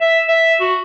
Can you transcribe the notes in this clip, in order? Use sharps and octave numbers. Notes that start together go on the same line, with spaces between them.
E5
E5
F#4